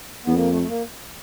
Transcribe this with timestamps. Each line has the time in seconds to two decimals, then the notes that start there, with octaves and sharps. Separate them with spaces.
0.24 E2 B3
0.33 F2 A#3
0.50 A3
0.62 A3
0.68 A#3